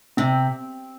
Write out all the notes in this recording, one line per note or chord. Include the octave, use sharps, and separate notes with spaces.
C3 C4